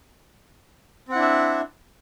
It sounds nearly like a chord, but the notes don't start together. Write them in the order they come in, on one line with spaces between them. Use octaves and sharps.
C4 F#5 E4 D4 E5